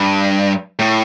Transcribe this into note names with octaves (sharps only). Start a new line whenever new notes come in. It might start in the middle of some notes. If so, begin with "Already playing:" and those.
Already playing: G2
A2